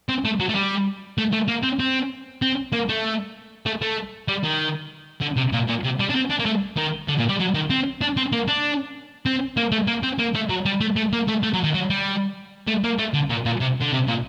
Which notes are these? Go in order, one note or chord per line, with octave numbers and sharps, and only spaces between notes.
C4
A3
F#3
A3
G3
A3
A3
A#3
C4
C4
C4
A#3
A3
A3
A3
G3
D#3
D3
C3
A#2
A#2
C3
G3
D4
C4
D4
A#3
A3
D#3
D3
A#2
G3
F#3
D#3
C4
D4
C4
A#3
D4
C4
A#3
A3
A#3
C4
A#3
A3
F#3
G3
A3
A3
A#3
A3
A3
F#3
D#3
F#3
G3
A3
A#3
A3
D3
A#2
A#2
C3
D3
C3
A#2